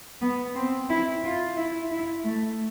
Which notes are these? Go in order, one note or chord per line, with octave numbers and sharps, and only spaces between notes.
B3
C4
E4
F4
E4
E4
A3